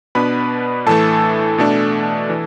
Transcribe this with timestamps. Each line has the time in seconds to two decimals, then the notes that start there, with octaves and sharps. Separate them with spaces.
0.15 B2 B3 D4 B4 B5
0.86 A2 E3 A3 A4 A5
1.58 B2 A3 D4
2.30 E3